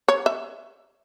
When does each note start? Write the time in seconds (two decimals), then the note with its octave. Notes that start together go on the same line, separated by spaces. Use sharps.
0.08 C#5
0.26 E5